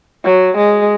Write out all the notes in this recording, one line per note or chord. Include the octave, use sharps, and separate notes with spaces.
F#3
G#3